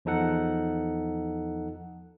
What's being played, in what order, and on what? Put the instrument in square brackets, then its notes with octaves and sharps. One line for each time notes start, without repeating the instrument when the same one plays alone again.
[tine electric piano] E2 F3 D#4 A4 F#5 F#6